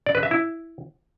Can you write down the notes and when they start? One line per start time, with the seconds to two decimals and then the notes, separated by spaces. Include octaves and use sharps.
0.06 D5
0.15 B4
0.23 E5
0.31 E4